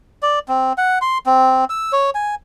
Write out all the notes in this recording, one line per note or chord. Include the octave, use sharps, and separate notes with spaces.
D5
C4
F#5
C6
C4
E6
C#5
G#5